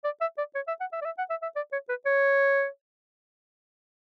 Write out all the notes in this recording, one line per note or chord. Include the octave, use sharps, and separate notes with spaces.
D5
E5
D5
C#5
E5
F#5
E5
D5
E5
F#5
E5
E5
D5
C#5
B4
C#5